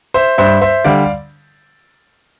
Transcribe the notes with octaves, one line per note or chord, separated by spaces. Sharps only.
C5 E5
G2 C5 E5
C5 E5
D3 G3 D5 F5